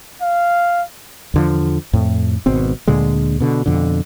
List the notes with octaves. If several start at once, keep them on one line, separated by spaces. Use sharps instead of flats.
F5
E2 D3 F3
F2 A2
G#1 B2 C4
D2 A#2 D3 G#3
B2 D3
F2 B2 D3